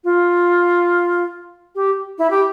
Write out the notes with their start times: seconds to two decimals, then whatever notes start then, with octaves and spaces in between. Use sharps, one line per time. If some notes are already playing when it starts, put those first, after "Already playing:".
0.04 F4
1.75 G4
2.18 E4
2.30 G4